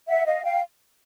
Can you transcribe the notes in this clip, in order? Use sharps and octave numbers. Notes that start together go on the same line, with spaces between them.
E5 F#5
D#5 F5
F5 G5